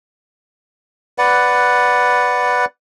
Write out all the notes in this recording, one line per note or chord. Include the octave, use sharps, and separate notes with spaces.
B4 D5 F#5